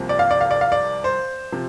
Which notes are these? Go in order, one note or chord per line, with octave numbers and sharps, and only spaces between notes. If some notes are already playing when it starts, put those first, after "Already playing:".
Already playing: C2 C3 F3 A#3
D5
F5
D5
F5
D5
F5
D5
C5
C3 F3